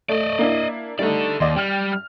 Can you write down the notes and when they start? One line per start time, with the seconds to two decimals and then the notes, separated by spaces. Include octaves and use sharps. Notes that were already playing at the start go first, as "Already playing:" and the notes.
0.09 A3 D5 D#5
0.39 A#3 D4 E4
0.99 G3 A3 D#4 A4 D5
1.40 D#2 D5 D#5 C6
1.56 G3 G5 F6 F7
1.92 F6